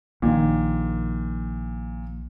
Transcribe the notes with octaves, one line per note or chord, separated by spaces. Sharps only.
A#1 A#2 D#3